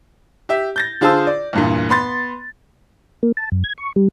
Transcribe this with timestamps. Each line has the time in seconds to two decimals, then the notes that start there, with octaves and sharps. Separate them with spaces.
0.49 G4 E5
0.76 G6 A6 A#6
1.01 D3 F4 G#4 C5 A5 E6
1.27 D5
1.53 E2 G2 A#2
1.89 B3 B5 C6 A6
3.23 A#3
3.37 A5
3.52 F#2
3.64 G#6
3.78 C#6
3.96 G3